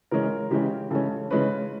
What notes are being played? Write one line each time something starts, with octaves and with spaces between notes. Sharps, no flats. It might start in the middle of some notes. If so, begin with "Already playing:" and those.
C#3 E3 G#3 C#4 A#4
C#3 E3 G#3 C#4 G4
C#3 E3 G#3 C#4 A4
C#3 E3 G#3 C#4 B4